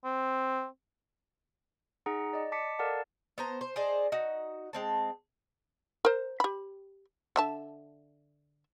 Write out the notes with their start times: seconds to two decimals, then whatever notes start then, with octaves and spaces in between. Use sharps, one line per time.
0.05 C4
2.06 D#4 G#4 F#5 A#5
2.33 D5 D#5
2.52 D#5 A5 D6 B6 C#7
2.79 A4 A#4 D5 F5 F#5 A5
3.38 B3 C5 A#5
3.61 C5
3.76 G#4 C5 D5 D#5
4.12 D#4 F#4
4.73 G#3 C4 A5
6.05 A#4 C5
6.40 G4 B5
7.36 D3 E5 A5